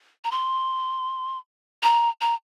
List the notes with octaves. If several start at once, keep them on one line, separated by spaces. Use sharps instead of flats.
A#5
C6
A#5
A#5